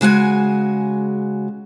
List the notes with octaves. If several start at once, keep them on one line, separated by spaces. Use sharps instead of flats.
C#3 G#3 F#4 G#5